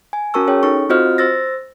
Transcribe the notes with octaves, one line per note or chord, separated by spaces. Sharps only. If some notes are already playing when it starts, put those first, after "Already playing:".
G#5
C#4 F#4 A#4 A5 C#6 E6
C#4 G#4 C#5 G5
D#4 A4 C#6
C4 F4 F#4 C5 D#5 F6
C5 E6 A6 A#6